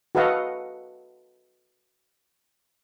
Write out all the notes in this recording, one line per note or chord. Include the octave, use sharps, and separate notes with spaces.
F#4 A4 B4 D#5 F5 F#5